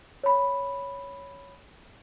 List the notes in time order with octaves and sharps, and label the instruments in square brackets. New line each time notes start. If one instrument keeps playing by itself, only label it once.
[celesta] C#5 B5